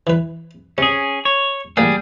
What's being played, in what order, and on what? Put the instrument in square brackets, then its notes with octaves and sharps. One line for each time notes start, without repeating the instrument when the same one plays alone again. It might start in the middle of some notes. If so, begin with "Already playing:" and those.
[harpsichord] E3 B4
[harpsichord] C3 [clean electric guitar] C#4 G#4
[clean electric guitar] C#5
[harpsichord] A1 A#3 F#5 [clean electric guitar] G3 G#4